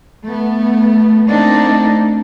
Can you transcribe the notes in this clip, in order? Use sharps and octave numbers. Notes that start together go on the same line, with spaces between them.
A3 B3
A3 A#3 C4 D4 D#4